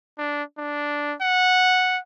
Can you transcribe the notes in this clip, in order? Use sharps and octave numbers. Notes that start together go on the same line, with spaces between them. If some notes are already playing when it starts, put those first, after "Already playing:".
D4
D4
F#5